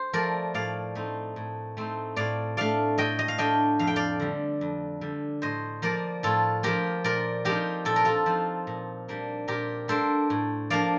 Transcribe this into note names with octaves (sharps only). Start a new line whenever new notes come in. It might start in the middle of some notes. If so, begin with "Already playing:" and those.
Already playing: C5
F3 A3 A#4 D5
A2 D5 F5
A3 C4 D#4
A2
A3 C4 D#4
A2 D5 F5
A3 D4 D5 F5
A2 D#5 G5
D#5
F5
A3 D4 D#5 G5
F2 F5
G5
D5 F5
D3 G3
F2
D3 G3
A2 C5 D#5
F3 A#3 A#4 D5
A2 F4 A4
F3 A#3 G4 A#4
A#2 A#4 D5
F3 C4 D#4 G4 A#4
A#2 A4
A#4
F4 A4
F3 C4 D#4
A#2
G3 A#3 D4
A#2 G4 A#4
G3 A#3 D4 A4 C5
A2
F3 A#3 D4 D5 F5